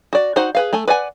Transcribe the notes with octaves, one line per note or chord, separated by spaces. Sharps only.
F#4 D5
D#4 F#4 C5 F#5
G#4 B4 F5
A3 A4 G#5
B4 D5 F#5 G#5